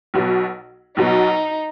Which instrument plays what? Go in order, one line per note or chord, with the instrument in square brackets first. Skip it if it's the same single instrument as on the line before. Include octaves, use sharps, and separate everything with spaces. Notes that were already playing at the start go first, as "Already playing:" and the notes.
[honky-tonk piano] B1 B2 F#3
[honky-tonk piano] B1 B2 F#3 [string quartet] D#4